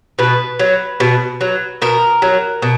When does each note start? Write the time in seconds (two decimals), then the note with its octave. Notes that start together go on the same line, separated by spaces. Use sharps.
0.19 B2 B4
0.59 F#3
1.00 B2
1.41 F#3
1.82 B2 A#4
2.22 F#3
2.62 B2